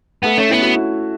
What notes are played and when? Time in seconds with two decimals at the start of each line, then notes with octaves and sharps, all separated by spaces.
0.24 A3 B3
0.37 A3 C#4
0.49 B3 E4
0.62 F#4
0.75 E4